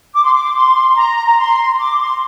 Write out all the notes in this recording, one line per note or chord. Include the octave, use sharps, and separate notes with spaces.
D6
C6
D6
C6
A#5
A#5
C6
D6
C6